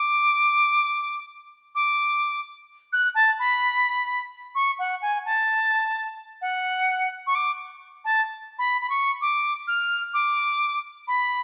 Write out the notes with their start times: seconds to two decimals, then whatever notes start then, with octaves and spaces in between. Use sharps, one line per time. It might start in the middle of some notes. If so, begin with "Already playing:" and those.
Already playing: D6
1.75 D6
2.93 F#6
3.15 A5
3.39 B5
4.55 C#6
4.79 F#5
5.02 G#5
5.25 A5
6.42 F#5
7.27 C#6
7.35 D6
8.05 A5
8.59 B5
8.82 B5
8.90 C#6
9.21 D6
9.68 F6
10.14 D6
11.08 B5